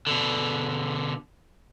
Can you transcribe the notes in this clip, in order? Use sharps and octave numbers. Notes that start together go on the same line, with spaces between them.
B2 D3